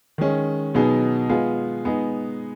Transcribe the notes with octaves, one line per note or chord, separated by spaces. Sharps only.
D#3 G#3 C#4
B2 F#3 B3 D#4 G#4
G#3 B3 F4 G#4
G#3 B3 D#4 G#4